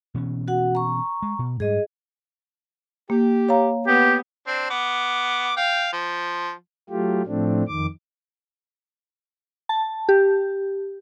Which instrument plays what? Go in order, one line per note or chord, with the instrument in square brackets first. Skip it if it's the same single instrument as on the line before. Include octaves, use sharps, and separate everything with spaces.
[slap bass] B2 E3 C#4
[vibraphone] F#4 F#5
A#5 C#6
[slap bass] G#3
B2
[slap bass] G#2 G3 [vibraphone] G#4 D#5
[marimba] A#3 [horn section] G4
[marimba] C#5 F5 A#5
[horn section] B3 [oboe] G4
[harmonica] C4 D4
B3 D6
F5 G5
F3
[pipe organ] F#3 A3 F4 G4
A2 F3 A3 C4 D4
F2 D#3 D6
[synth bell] A5
G4